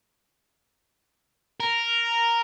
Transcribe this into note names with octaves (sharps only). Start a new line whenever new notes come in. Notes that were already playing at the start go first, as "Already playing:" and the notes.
A#4